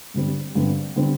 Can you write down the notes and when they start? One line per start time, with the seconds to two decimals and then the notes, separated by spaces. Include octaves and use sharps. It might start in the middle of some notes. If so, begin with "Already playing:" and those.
0.14 G2 D3 G3 C4
0.55 G2 D3 G3 C4
0.96 D3 G3 C4